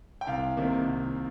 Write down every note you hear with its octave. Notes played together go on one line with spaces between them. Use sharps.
G5
C2 F5
C3 D#3 A#3
C2